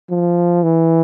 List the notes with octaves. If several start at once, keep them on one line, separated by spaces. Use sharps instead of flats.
F3
E3